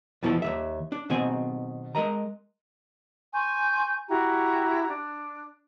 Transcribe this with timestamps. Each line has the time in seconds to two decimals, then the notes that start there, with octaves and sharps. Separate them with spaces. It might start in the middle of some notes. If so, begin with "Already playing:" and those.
0.23 E2 B2 F3 E4 A4
0.42 D#2 C3 E5
0.92 D4
1.10 B2 D#3 C4 G#5
1.95 G#3 A#4 D#5 A#5
3.33 G#5 C6 C#6 G6
4.08 E4 F#4 G4 A#5
4.88 D4